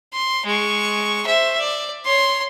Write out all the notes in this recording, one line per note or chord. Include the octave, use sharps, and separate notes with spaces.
C6
G#3 C#6
C5 E5
D5
C#5 C6